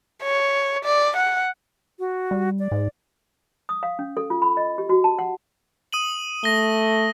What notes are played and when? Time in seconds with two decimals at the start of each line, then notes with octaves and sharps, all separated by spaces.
0.23 C#5
0.85 D5
1.16 F#5
1.99 F#4
2.31 G3
2.59 D5
2.72 G#2
3.69 D#6
3.83 F5
3.99 C#4
4.17 A4
4.30 F4
4.42 B5
4.57 D#5
4.78 G4
4.89 F#4
5.04 A5
5.19 F#5
5.93 D#6 D#7 F#7
6.44 A3 A#6 G7